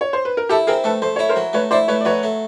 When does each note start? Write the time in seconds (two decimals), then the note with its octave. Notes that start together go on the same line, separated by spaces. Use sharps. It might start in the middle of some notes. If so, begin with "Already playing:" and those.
0.01 C#5
0.13 C5
0.25 B4
0.37 A#4
0.49 E4 G4 A4
0.67 C4 G#4 A#4
0.84 A3 A4 B4
1.02 A3 C5
1.16 E4 C#5
1.29 A#4 C5
1.36 F#3
1.53 A3 B4 C#5
1.71 E4 C5 D5
1.88 A3 B4 C#5
2.01 D5
2.05 F#3 B4 C#5
2.23 A3